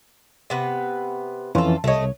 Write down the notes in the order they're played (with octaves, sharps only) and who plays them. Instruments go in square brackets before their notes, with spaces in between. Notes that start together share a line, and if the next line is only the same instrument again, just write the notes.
[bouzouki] C3 B3 B4
[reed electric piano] F2 E3 C#4 [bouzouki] F4 A4
[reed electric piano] C2 C#5 [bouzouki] A3 D#5